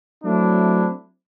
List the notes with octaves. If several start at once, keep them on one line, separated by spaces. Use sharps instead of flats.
F#3 A3 C4 D4 E4